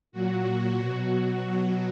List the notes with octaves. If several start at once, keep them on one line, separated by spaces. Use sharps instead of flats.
A#2 F#3 F#4
B2 F#3
B2 F#3